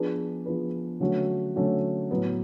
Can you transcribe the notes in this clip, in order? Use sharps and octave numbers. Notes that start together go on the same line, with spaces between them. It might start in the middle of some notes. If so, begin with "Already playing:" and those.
Already playing: F3 B3 D4 G#4 B4
F3 B3 D4 G#4 B4
D3 F#3 A3 C#4 F#4
D3 F#3 A3 C#4 F#4
A2 F#3 B3